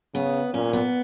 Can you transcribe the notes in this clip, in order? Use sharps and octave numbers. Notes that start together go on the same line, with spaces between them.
C#3 B3
A#2 C#4
B3